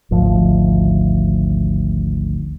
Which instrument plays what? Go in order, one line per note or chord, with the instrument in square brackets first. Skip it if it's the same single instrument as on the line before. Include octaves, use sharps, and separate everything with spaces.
[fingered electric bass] G#1 D2 F3